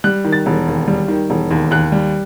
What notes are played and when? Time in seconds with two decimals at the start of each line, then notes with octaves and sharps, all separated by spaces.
0.04 G3 F#6
0.25 D#3
0.33 A6
0.46 E1
0.67 D#2
0.88 G3
1.08 D#3
1.30 E1
1.51 D#2
1.71 D#2 F#6
1.92 G3